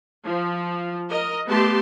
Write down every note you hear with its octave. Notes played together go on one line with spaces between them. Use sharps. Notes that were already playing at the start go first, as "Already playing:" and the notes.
F3
A#4 D#5
A3 B3 G4 A5 C6